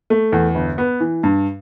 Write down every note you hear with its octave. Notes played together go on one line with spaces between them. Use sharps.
A3
E2
G1
B3
E3
G2